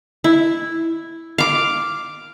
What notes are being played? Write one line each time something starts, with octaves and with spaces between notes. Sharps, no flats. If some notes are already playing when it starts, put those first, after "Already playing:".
E4
F5 D6